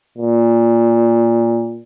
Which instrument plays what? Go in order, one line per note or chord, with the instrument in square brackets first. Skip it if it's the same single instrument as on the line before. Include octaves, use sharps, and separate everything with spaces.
[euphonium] A#2